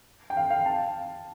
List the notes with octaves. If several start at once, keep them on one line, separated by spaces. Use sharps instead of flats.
G5
F5
F5
A5